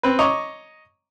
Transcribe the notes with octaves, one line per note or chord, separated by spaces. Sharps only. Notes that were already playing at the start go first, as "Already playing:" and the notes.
C4 B4
C#5 D#5 A#5 C#6 D6